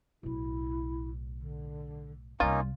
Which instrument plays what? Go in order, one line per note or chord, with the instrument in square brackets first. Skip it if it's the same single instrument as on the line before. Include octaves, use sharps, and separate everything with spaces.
[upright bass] B1 A2 [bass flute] E4
[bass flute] D3
[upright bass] C2 C3 [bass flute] G3 [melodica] A#3 C#4 D#4 [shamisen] F4